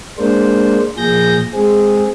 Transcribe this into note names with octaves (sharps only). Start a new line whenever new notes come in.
G#3 A#3 D4 C5
A#2 F3 G#4 G6 A#6
G#3 C4 G#4